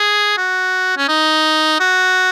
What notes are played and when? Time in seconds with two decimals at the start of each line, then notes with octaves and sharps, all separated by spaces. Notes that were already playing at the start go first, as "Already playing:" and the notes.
Already playing: G#4
0.38 F#4
0.97 C#4
1.08 D#4
1.80 F#4